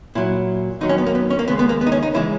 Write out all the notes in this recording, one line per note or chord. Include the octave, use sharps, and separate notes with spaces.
A#2 F#3 E4
D#2 D#3 F#3 D#4
C#4
B3
A#3
B3
C#4
A#3
D#2 C#3 G#3 B3
B3
A#3
B3
D#4
C#4
D#4
C#3 E3 G#3 E4